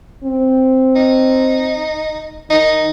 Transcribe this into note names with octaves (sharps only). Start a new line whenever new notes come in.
C4
D#4
D#3 D#4